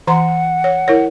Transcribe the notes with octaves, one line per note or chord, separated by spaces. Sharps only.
E3 F#5 A#5 C6
C#5
E4 A#4 C#5